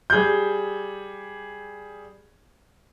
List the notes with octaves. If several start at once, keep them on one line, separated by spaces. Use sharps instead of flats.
G3 G#4 G6